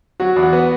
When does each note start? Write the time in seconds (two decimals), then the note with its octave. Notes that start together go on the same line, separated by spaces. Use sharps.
0.20 F#3 F#4
0.36 E2
0.43 F#4
0.53 B3